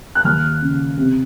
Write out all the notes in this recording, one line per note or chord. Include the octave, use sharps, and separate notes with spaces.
F#6
D#2 F6
C#3
C3